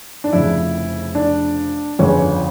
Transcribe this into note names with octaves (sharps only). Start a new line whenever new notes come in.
D4
F1 F2 C#3 E4
D4
G1 F2 C#3 C#4
C#4